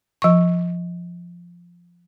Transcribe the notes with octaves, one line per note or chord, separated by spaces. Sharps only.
F3 C#6